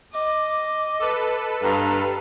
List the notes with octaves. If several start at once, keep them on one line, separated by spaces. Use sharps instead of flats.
D#5 D6
A4 B4
G2 F5 A#5